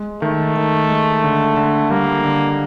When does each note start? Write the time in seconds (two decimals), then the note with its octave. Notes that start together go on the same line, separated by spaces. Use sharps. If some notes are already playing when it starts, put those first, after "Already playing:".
Already playing: G#3
0.22 D#3 A3
0.56 D#3
0.89 G#3
1.24 D3
1.57 D3
1.91 G3 A#3
2.24 D3